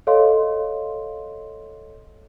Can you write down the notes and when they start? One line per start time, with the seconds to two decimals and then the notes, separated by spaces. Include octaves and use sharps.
0.07 A4 C#5 D#5 F5 C6